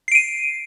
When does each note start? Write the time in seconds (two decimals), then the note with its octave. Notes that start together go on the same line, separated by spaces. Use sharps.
0.08 C7
0.12 D7
0.15 D#7